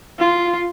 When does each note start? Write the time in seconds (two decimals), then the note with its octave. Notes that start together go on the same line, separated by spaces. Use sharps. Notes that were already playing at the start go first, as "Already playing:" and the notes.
0.19 F4